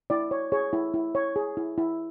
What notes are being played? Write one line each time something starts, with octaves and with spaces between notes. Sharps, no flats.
E4 D5
C#5
G#4 C#5
E4
E4
C#5
G#4
E4
E4